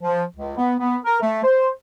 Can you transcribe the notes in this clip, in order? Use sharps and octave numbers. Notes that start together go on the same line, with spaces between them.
F3
C#2
B3
B3
A#4
A3
C5